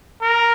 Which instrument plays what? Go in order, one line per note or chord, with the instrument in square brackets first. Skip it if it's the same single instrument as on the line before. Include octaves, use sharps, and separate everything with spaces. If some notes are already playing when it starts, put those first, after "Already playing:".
[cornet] A#4